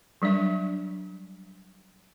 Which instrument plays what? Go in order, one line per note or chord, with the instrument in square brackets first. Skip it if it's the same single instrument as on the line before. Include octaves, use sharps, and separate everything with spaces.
[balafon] F#3 G3 D4 E5